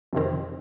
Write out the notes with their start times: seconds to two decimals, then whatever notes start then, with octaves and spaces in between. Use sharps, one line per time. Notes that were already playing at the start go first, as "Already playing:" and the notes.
0.13 F2 C3 D#3 C4